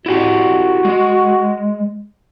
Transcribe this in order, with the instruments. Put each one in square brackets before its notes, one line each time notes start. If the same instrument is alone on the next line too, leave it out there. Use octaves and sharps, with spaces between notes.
[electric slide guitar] E4 G4 G#5 [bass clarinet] F#4
[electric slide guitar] G#3